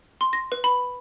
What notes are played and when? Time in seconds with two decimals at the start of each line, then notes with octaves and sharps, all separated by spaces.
0.21 C6
0.33 A#6
0.52 B4
0.64 B5